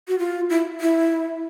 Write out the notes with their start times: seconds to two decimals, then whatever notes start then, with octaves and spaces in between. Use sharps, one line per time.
0.08 F#4
0.19 F4
0.50 E4
0.81 E4